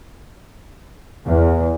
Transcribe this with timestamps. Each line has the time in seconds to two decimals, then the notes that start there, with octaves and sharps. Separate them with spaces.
1.26 E2